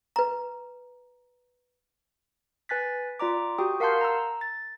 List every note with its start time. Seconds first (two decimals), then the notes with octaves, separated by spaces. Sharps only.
0.16 B4 A#5
2.69 B4 G#5 F#6 A6 B6
3.19 F4 D5 A#5 D6
3.58 F#4 G4 G5 D#6
3.80 A#4 F5 F#5 A5 C6 G6
4.01 A#5 E6
4.41 A6